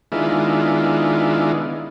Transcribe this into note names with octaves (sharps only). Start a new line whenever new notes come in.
D#3 G#3 B3 D4 E4 F4